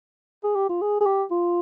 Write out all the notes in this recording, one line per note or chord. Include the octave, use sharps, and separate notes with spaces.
G#4
G4
F4
G#4
G#4
G4
F4